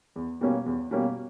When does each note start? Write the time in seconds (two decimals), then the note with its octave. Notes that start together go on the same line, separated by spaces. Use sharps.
0.16 E2
0.41 B2 G3 A#3 C#4
0.66 E2
0.91 B2 G3 A#3 C#4